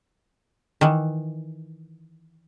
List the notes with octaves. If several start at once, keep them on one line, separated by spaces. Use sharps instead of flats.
D#3 E3